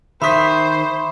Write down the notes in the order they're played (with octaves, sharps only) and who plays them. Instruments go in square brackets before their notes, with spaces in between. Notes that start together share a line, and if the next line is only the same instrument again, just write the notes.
[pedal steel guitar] D#3 [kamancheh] C5 [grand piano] E5 D#6 B6 [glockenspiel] B5 C#6